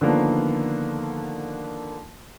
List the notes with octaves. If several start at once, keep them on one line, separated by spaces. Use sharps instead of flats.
D3 D#3 F3 A#3 B3